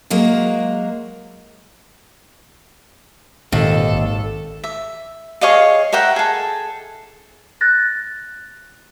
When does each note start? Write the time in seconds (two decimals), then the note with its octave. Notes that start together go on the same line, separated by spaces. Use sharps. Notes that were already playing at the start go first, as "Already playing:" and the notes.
0.10 F#3 G#3 A#3
3.52 G#1 D#2 A#2 A4
3.93 A1
4.64 E5
5.41 G#4 C#5 D#5 F5
5.93 A#4 E5 F#5 G5
6.16 G#4 A4
7.61 F#6 A6 A#6